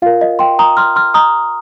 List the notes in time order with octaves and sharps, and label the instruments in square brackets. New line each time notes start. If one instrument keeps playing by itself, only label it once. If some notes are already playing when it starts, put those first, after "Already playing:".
[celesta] F4 F5
A#4
D#5
G5 C6
A#5 D#6
C6 F6
C6 F6
A#5 D#6